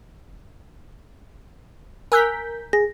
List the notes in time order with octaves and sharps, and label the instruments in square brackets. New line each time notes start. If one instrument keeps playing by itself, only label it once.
[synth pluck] A#4 G6 B6 [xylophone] G#5 E6 F#6
[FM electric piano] G#4 [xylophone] A#6